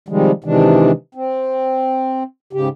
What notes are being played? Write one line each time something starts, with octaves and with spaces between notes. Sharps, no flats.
C3 D#3 F3 G3 G#3
C3 D#3 E3 G#3 D4
C4
G#2 C#3 G4